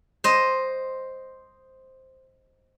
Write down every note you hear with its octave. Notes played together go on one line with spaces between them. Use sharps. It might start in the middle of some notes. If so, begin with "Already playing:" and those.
C5 D#5